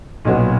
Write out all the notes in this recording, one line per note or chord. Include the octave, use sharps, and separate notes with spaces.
B1 A#2 F#3 B3